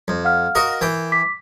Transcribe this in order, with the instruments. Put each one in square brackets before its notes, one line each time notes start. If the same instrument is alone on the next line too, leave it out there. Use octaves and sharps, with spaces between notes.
[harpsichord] F2
[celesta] F5 F#5 F6
[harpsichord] F#4 A#4 D#5
[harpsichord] E3 G5 [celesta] A#4
[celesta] D6 B6